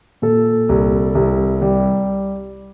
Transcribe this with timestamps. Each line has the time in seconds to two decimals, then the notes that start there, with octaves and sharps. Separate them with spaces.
0.22 A#2 A4
0.69 C2
1.15 C2
1.62 G3